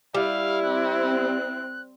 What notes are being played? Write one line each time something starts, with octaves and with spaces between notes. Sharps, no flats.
G3 E4 F5
C4 F#6